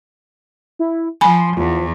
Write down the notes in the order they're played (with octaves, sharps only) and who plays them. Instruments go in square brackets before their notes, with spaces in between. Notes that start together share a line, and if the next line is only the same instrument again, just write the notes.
[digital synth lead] E4
[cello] F3 [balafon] G#5 B5 [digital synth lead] C6
[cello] E2 [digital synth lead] F3